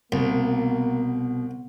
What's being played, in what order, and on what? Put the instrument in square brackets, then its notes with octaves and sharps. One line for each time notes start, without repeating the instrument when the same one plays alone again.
[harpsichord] C2 [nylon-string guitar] B2 [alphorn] A#3